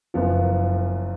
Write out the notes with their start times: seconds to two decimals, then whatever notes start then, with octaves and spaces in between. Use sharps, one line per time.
0.14 F#1 F#2 F3 B3 F4